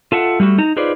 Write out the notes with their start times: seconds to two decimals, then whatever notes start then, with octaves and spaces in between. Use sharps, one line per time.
0.12 F4 A4 E5 F#5
0.40 G3 A3 F4 F#4
0.58 D#4 A#5
0.76 D#4 F4 G#4 B4 C5 D5